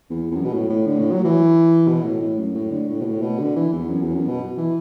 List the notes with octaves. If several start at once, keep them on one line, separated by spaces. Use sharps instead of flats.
E2
E2
F#2
B2
A2
A2
D3
A2
F#3
E3
B2
A2
A2
F#2
A2
D3
A2
B2
A2
B2
D3
E3
E2
F#2
E2
F#2
B2
E3